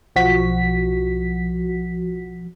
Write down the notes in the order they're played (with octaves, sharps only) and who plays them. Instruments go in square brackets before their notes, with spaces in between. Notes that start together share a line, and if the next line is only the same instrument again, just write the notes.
[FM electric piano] B1 F3 F#4 B6